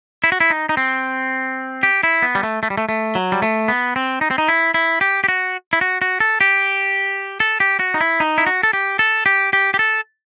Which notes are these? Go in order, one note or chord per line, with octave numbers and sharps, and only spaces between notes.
E4
F#4
E4
D#4
D#4
C4
G4
E4
B3
G3
A3
A3
G3
A3
A3
F#3
G3
A3
B3
C4
D#4
C4
D#4
E4
E4
G4
G4
F#4
E4
F#4
F#4
A4
G4
A4
G4
F#4
D#4
E4
D#4
E4
F#4
A4
G4
A4
G4
G4
G4
A4